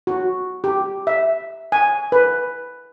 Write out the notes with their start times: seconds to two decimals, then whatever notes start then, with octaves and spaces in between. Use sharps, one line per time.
0.07 F#4
0.64 G4
1.07 E5
1.72 G#5
2.12 B4